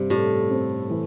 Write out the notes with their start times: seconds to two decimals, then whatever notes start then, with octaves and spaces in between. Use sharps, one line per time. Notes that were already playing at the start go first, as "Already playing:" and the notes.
Already playing: G2 C3 G3
0.10 A2 G3
0.51 C4
0.90 E3